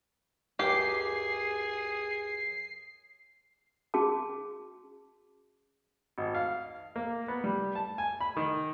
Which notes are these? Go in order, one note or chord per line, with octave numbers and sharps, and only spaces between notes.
C#2 F#2 G4 G#4 C7
C#4 F#4 G#4 A5 D6
G#1
F5
A#3
B3
G3
A5
G#5
B5
D#3